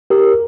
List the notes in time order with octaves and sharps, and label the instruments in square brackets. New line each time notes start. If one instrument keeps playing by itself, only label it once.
[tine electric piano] G4 A#4